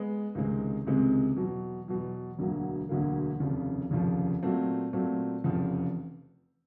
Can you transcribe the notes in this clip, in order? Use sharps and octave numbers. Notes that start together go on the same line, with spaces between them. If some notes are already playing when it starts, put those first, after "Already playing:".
Already playing: G#3 B3
C#2 C3 D#3 G#3 C4
C#2 C3 D#3 G#3 C4
E2 B2 F#3
E2 B2 F#3
E1 D2 D3 F#3 A#3
E1 D2 D3 F#3 A#3
F1 D#2 C#3 F3
F1 D#2 C#3 F3
A#2 F#3 A3 C4
A#2 F#3 A3 C4
F1 E2 C#3 F3